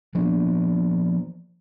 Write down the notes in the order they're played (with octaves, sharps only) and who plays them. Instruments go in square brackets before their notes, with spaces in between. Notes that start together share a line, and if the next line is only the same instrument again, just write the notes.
[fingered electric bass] F3 A#3 B3 D4